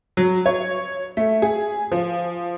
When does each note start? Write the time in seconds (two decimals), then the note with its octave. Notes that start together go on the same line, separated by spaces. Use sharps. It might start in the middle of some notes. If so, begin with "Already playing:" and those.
0.17 F#3
0.46 C#5
1.17 A3
1.42 G#4
1.92 F3